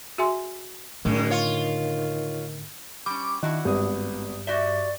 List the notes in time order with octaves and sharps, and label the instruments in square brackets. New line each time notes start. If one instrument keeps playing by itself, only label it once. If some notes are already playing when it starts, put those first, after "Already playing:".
[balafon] F#4 G#4 E5 G#5 C6
[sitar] F#2 G#3 [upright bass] A2 D3 [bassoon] D#3
[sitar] F4 C#5
[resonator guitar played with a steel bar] G3 C#4 [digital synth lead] D6
[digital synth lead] D#3 [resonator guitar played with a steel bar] D4 E4 F#4
[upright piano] G#1 B3 D#6 [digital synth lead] G2
[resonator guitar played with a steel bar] F#4 G4 E5 [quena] D5 [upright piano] G7